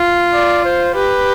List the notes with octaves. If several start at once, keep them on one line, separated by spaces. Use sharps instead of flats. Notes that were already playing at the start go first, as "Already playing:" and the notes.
Already playing: F4
D5
C5
G4 B4